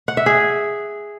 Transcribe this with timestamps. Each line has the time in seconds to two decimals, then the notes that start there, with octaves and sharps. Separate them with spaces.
0.08 F#5
0.17 E5
0.26 G#4